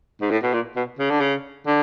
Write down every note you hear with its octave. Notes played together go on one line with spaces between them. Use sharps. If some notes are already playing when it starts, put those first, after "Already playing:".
G#2
A2
B2
A#2
B2
C#3
D3
C#3
D3